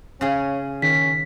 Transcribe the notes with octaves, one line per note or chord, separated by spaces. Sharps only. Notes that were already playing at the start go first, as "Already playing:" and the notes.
C#3 C#4 G#4
D#3 C#4 B6